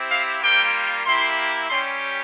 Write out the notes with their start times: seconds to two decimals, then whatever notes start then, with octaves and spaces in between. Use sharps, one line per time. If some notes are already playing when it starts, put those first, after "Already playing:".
Already playing: C4 E4 G4
0.09 F5
0.41 G3 A#3 F4 G5
1.05 A#3 E4 G4 C6
1.69 G3 C#4 G4 C6